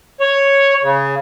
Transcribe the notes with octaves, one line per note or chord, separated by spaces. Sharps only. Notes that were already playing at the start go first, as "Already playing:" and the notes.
C#5
C#3